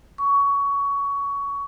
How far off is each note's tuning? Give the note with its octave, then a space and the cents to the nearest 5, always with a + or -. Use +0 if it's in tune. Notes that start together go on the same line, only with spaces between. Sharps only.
C#6 +20